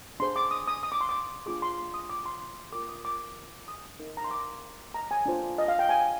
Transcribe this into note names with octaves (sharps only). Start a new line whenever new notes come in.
D4 G#4 C5 C6
D6
D#6
D#6
D#6
D6
C6
D6
D4 F4 G#4 D6
C6
D#6
D6
C6
F4 A#4 D6
D#6
D6
D#6
D#4 A#4
A#5
C6
D6
A#5
G#5
D4 F4 C5
D#5
F5
G5
G#5